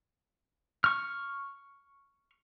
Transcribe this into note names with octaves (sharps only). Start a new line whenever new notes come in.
C#6 F6